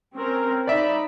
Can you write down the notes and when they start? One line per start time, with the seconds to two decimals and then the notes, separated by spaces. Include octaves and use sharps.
0.15 C4 C#4 A#4
0.67 D#4 D5 E5 B5